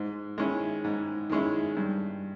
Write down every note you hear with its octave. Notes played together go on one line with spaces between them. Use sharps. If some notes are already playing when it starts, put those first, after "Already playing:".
Already playing: G#2
D#3 G#3 C#4 E4
G#2
D#3 G#3 C#4 E4
G2